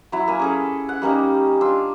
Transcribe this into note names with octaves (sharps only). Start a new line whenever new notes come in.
F#3 E4
A#3 G#5
C#4 G#4 A4
F#5
G3 A#3 C#4 D#4
D4 F4 E6